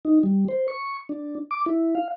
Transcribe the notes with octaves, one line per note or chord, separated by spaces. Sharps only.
D#4
G3
C5
C#6
D4
D6
E4
F5